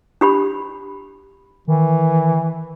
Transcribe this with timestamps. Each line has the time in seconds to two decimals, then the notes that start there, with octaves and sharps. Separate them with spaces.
0.21 D4 G4 B5
1.67 D#3 E3